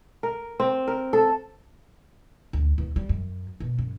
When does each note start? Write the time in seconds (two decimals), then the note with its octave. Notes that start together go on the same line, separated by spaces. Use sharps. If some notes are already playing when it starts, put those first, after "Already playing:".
0.23 A#4
0.60 C4
0.88 A#4
1.13 A4
2.53 D2
2.78 E2
2.96 G3
3.09 F#2
3.60 B2
3.79 F#2